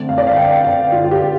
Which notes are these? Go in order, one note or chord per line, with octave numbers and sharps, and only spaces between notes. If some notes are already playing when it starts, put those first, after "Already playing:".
Already playing: D3 A3 C4
F5
D5
F5
G5
F5
F4
F4
G4